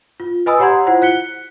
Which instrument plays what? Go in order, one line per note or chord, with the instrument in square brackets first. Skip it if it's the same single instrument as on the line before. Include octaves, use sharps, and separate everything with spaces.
[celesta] F4
B4 D#5 G#5 B5 D#6 E6
G4 C#5 F#5 A#5 C6 G#6
E4 F4 C5 F#5
F#6 B6 C#7 G7